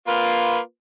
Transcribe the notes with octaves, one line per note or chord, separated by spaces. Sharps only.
A#3 F4 B4